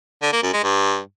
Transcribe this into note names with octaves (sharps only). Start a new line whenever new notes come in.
D3
A#3
F#2
G#3
G2